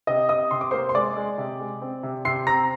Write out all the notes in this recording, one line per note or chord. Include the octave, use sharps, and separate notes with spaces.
C3 D#5 D#6
C3 D#5 D#6
C3 C6
D6
A#3 C5 C6
C6
G#3 D5 D6
G#3
C3
G#3
C4
C3
C3 C6 C7
C4 A#5 A#6